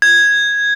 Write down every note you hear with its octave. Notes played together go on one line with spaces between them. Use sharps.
G#6